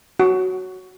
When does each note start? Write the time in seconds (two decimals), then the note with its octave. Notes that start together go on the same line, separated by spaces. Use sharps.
0.20 F#4